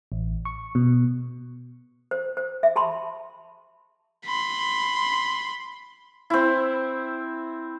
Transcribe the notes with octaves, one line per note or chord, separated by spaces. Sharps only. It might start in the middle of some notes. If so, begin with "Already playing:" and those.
A1
C#6
B2
C5
C5
E5
G4 A5 B5 C6
B5 C6
C4 E4